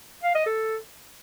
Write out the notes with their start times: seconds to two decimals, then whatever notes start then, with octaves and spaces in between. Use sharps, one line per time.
0.23 F5
0.35 D#5
0.46 A4